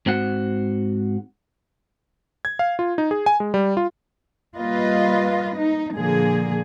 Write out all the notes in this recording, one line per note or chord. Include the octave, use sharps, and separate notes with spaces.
G#2 C4 F#4 F#5
G#6
F5
F4
D#4
G#4
G#5
G#3
G3
F4
G3 A#3 F4 B4 D#5
D#4
A#2 D3 F3 A#3 G#4